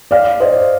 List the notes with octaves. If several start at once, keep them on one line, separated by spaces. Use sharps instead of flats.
D5 F5
C5 D#5